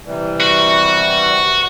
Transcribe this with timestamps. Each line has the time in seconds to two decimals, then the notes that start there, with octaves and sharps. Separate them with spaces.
0.05 C3 E3 G3
0.40 F#4